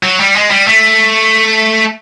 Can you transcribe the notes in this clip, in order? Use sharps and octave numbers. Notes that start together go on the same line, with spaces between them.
F#3
G3
G#3
G3
A3